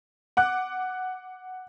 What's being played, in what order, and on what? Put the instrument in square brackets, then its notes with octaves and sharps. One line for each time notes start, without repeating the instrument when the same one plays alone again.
[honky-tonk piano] F#5 D6 F#6